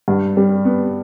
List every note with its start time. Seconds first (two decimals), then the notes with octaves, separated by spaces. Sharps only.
0.08 G2
0.37 G3
0.65 B3